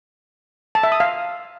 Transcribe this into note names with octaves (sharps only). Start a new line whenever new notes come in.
A5
E5
D#6
F5